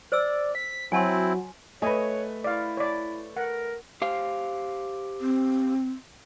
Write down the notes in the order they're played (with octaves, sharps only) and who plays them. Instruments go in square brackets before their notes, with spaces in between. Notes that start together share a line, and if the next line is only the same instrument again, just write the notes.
[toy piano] C5 E6 [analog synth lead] D5
[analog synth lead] B6
[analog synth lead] F#3 [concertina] C4 E4 [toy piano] G#5 A5 C6
[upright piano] A3 B4 [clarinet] C#5 [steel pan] D#5 G#5
[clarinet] E4 [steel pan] D5 F5
[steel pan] C#5 D5
[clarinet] A#4 [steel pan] F#5
[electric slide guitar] G4 C5 F5
[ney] C4